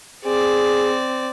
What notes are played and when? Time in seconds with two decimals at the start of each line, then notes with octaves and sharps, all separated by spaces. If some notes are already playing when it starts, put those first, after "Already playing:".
0.25 C4 G#4 D5